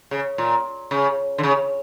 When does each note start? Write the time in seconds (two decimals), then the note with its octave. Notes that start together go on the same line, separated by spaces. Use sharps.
0.11 C#3
0.38 A#2
0.91 C#3
1.38 D3
1.43 C#3